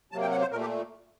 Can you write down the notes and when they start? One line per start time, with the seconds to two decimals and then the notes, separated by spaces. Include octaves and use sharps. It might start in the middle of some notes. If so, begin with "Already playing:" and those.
0.12 C3 F#3 A#3 A5
0.22 G5
0.31 F#5
0.41 C5
0.51 A#2 A#4
0.54 A3
0.61 G4